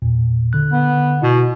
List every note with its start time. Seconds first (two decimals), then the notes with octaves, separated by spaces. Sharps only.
0.02 E2 A#2
0.53 D3 F#6
0.73 B3
1.22 B2 E4